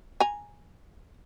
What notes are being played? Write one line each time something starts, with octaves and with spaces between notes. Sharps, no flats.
G#5 A#5